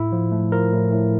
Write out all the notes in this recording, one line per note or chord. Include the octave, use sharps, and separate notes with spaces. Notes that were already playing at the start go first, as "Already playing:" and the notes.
Already playing: A2 E4
F3
A3
F3 A#4
A2
A2